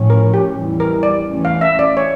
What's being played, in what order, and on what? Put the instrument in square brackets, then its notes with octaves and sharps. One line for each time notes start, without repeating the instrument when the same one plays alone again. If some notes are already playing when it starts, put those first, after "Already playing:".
Already playing: [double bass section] A2 F3 C#4
[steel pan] A#4
G4
[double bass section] E2 E3 G3
[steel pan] A#4
D5
[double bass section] E2 E3 A3 C#4
[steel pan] F5
E5
D5
C#5